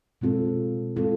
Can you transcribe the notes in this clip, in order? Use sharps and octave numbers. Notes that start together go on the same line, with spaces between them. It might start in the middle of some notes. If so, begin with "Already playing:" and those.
B2 G#3 C4 F4 A4
B2 G#3 C4 F4 A4